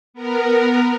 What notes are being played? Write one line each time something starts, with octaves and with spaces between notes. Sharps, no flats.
B3 A#4